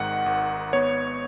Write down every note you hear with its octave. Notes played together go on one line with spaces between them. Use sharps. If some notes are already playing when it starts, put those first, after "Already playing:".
Already playing: G#1 G#2 D#3 F#5
G#1
B3 C#5